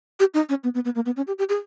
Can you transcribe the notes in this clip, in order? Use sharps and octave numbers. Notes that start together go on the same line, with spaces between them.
G4
D#4
C#4
B3
B3
B3
A#3
B3
C#4
G4
G4
G#4